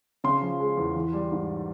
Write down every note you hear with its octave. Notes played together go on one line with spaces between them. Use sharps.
C#3 C6
F3
G#3
E2
E3
G3
G#2